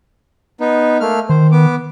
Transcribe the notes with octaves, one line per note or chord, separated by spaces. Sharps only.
B3 D#4
A3 A#3 F6
D#3 C5
B3 D6